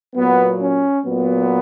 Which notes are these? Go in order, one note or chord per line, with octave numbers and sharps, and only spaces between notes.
A#2 F#3 B3
C#4
A#2 F#3 B3